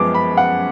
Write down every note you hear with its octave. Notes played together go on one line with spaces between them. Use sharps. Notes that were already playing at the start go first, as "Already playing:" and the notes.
Already playing: F#2 F3 G#3 B3 D6
B5
F#5